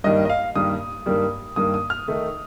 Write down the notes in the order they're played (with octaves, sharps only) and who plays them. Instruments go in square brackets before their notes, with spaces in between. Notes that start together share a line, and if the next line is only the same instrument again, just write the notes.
[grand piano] G2 D#3 G3 A#3 D#5
D#5
F5
G2 D#3 G3 A#3 D#6
G2 D#3 G3 A#3
G2 D#3 G3 A#3 D#6
D#6
F6
D#3 A3 D#4